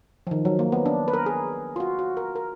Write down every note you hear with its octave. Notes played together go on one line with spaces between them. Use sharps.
F3
D#3
F#3
A#3
B3
D4
B4
A#4
G#4
F4
F#4
F#4
A#4
A#4